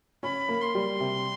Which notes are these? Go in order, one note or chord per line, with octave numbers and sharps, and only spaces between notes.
C#4 B5
A#3
C6
G3
C3